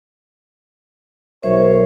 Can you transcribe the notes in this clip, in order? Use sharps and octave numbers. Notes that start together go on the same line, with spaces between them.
B1 A#4 C5 C#5 E5